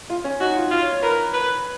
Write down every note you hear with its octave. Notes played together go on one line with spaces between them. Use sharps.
F4
C#4
D#4 F#4
F4
F4
C#5
C#5
A#4 B4
B4